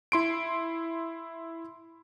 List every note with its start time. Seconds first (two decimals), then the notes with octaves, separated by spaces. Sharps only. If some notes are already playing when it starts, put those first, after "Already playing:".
0.12 E4 C6 D7